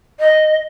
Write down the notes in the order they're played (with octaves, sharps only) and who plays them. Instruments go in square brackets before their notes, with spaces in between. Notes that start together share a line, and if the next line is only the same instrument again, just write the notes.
[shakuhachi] D#5